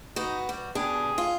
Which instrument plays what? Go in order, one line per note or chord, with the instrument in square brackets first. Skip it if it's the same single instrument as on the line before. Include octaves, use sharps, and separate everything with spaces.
[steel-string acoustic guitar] B3 F#4 [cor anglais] D#4
[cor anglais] G3 [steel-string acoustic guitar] F#4
[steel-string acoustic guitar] B2 D4 G4 [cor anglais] G#4
[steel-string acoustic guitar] F4